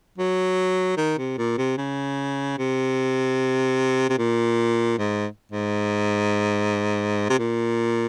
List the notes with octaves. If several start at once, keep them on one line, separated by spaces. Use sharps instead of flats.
F#3
D#3
C3
A#2
C3
C#3
C3
C3
A#2
G#2
G#2
C3
A#2